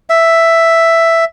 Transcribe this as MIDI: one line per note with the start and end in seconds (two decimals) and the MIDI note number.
0.10 1.25 76